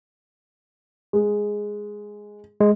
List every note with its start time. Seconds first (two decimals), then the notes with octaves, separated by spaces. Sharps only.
1.13 G#3
2.60 G#3